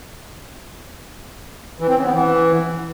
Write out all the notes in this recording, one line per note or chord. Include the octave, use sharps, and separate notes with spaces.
E3
C4
C#3
B3
E3